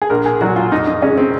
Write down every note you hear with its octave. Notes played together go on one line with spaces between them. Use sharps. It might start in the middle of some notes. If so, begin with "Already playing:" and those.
G#4
A#1 A#4
G#4
A#2 F#3 F#4
F4
F2 D#4
D#4
C#3 G#3 C#4
C4